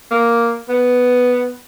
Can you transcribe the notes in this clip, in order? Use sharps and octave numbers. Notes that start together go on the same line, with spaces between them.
A#3
B3